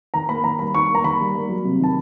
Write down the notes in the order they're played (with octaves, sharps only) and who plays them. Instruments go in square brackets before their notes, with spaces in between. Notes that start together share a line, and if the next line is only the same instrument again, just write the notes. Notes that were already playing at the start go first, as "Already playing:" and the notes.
[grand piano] D#3 A#5
A#3 B5
D#3 A#5
G3 B5
D#3 C#6
A#3 A#5
D#3 B5
G3
A#3
F#3
C3
D#3 A5